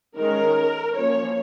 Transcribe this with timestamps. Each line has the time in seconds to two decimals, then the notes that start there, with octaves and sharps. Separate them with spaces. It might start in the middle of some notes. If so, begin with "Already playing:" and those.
0.17 D#3 G#3 C#4 A#4
0.96 F3 A#3 C#4 C#5